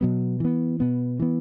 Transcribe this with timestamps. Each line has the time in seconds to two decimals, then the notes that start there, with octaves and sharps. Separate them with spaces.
0.01 B2 F#3 B3
0.40 E3 B3
0.80 B2 B3
1.20 E3 B3